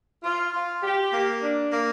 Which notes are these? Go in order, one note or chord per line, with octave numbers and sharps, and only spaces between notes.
F4
F4
G4
A#3
D4
A#3